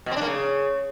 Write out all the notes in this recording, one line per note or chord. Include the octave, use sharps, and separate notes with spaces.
B2
C4
D4
A#3
C#3